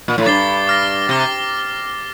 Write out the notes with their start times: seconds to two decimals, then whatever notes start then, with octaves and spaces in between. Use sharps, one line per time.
0.08 A#2
0.18 A2
0.26 G2 D6 A6 C7 G7
0.67 D6 F6 A#6
1.09 C3 D6 F6 A#6